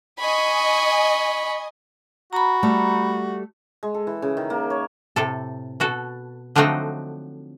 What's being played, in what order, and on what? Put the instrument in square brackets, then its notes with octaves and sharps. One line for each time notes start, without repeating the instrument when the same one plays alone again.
[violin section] D#5 G#5 [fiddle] B5 C#6
[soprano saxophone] F#4 [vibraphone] A#5 B5
[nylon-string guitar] G3 A3
[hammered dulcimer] G#3
A4
E3
C#3
D#3
A#3
C#5
[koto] A2 C3 A4
B2 F#4 A4
D3 F3 F#3 A3 C4 D#4